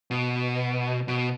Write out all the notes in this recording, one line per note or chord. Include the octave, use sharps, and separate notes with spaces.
B2
B2